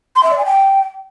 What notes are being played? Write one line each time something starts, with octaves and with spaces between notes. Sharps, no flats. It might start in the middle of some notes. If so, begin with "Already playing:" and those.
C6
E5
D5
G#5
G5